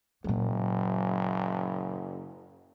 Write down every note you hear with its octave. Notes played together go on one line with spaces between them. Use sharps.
F#1 A#2 F#3